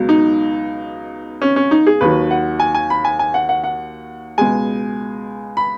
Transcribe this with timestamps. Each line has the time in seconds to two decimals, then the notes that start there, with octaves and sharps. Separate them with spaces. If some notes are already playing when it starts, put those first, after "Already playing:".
Already playing: C#2 B2 F#3
0.09 D#4
1.42 C#4
1.56 C#4
1.71 D#4
1.87 G#4
2.01 D#2 D#3 F#3 B4
2.31 F#5
2.60 G#5
2.74 G#5
2.90 B5
3.05 G#5
3.19 G#5
3.34 F#5
3.49 F#5
3.64 F#5
4.38 C#2 B2 G#3 G#5
5.57 B5